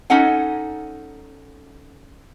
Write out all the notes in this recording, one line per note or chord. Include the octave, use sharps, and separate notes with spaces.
C#4 D#4 A4 F#5 G#5